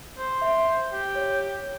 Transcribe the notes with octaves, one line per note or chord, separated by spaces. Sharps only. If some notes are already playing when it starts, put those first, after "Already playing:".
C5
E5
G4
C#5